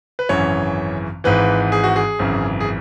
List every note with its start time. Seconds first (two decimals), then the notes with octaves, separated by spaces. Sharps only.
0.19 B4
0.29 G#1 F#2 C#3 E3 C#5
1.24 G#1 G#2 E3 B4
1.72 G#4
1.84 F#4
1.96 G#4
2.19 G#1 F#2 C#3 E3
2.60 G#4